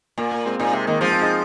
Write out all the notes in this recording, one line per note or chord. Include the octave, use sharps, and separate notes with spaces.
A#2 A#3
A#3
G#3 C4
A#2 A#3 D#4
C3 G#3
D#3 A#3
F3 G#3 C4
G#3 C4
D#4 G#4